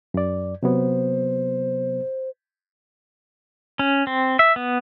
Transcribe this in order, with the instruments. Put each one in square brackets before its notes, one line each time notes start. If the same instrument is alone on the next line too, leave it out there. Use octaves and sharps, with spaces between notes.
[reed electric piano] F#2 D5
[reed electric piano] C3 F#3 B3 [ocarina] C5
[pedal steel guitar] C#4
C4
E5
B3